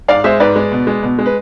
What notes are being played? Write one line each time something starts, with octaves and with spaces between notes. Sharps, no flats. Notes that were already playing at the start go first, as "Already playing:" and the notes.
G#2 D5 F5
G#3 C5 E5
G#2 B4 D5
G#3
B2
G#3
B2
G#3
B4